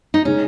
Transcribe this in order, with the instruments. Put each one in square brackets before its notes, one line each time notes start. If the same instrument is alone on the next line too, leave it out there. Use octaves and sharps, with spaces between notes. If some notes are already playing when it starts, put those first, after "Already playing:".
[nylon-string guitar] D#4
[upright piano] C#3 G#3 D#4 [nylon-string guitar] C#4